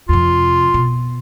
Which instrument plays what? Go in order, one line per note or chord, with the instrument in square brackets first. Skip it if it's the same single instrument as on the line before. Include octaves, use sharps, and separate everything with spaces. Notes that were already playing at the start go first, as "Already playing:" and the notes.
[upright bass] F2 C3 [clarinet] F4
[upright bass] B2